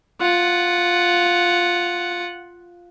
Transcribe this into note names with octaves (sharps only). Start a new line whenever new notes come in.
F4 F#5